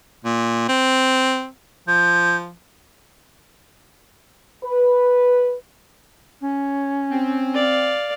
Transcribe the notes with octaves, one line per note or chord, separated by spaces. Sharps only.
A#2
C4
F3 G6
B4
C#4
C4
D5 F5